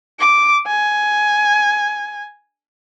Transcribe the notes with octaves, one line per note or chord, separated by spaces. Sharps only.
D6
G#5